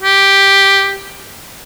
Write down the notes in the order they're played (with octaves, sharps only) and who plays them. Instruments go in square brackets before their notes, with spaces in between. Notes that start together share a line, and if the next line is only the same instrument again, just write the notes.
[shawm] G4